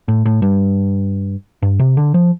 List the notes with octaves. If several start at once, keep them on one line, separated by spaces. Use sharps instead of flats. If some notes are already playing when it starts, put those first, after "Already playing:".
A2
A2
G2
G2
C3
D3
F3